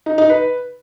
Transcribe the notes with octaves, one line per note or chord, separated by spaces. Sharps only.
D#4
D#4
B4